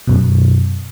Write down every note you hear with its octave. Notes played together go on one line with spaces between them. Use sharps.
F#2 B2